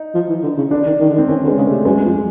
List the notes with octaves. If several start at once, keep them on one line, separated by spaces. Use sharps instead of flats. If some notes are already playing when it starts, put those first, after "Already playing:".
Already playing: D#4
F3
E3
D3
C#3
D3 D4
D#3
D#3
D3
D#3
C4
D#3 C#4
D3
G#3
C#3
C3 A3
F#2 G#3
F2